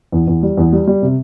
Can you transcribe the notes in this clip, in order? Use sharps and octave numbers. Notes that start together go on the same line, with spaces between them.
E2
E2
G3
E2
G3
G3
C3